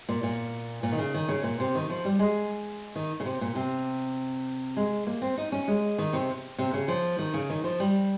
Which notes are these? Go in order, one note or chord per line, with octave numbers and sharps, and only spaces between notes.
A#2
A#2
A#2
D#3
C#3
D#3
C#3
A#2
C3
D#3
F3
G3
G#3
D#3
C#3
C3
A#2
C3
G#3
A#3
C4
D#4
C#4
G#3
D#3
C3
C3
C#3
F3
D#3
C#3
D#3
F3
G3